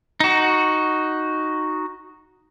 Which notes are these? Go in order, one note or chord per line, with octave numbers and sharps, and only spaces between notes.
D#4 F#4